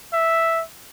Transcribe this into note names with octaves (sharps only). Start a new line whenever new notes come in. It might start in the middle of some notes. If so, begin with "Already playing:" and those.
E5